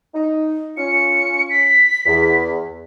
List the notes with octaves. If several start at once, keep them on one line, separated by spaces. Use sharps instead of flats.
D#4
C#4 F4 C#7
B6
E2